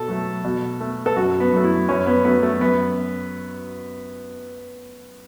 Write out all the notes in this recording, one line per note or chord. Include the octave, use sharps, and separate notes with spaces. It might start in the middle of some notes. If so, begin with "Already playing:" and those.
Already playing: B2 A4
F#3 A3
B2
A3
A4
F#2 F#4
B3
F#3 A3
E4
F#2 C#4
B3
F#3 A3 B3
A3
F#2 B3